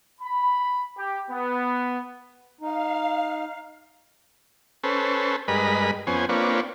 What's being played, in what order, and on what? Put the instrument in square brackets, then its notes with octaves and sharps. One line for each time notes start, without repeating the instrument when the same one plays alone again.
[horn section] B5
G4
B3
[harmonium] D#4 [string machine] F5
[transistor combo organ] C#4 A4 B4 C5
G2 G#3 A#4 B4 D#5 B5
F2 B3 C#4 C5 G#5
A#3 C4 D4 F4 B4 C#5